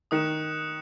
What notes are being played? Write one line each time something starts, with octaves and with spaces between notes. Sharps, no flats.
D#3 D#6 F#6 C#7 E7